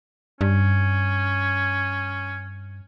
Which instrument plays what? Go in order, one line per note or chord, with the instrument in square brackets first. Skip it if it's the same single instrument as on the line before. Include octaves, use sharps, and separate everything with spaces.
[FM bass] G2 [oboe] C#4